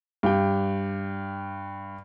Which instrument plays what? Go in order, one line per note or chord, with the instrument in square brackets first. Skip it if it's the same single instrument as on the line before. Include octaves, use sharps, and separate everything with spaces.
[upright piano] G2 G4 G5